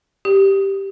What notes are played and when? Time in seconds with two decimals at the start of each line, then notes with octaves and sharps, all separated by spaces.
0.25 G4